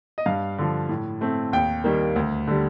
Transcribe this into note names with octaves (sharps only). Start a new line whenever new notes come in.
D#5
G2 F5
D3 F3
A2
A3 C4
D#2 G5
D#3 G3 A#3
D2
D3 G3